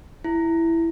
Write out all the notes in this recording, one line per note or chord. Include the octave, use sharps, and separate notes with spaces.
E4